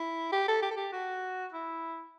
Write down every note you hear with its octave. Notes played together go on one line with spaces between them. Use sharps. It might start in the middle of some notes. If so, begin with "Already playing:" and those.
Already playing: E4
G4
A4
G4
A4
G4
F#4
E4